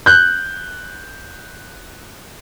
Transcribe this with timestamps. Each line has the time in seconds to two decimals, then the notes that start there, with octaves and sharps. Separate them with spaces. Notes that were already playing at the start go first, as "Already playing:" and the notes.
0.06 F#6 G6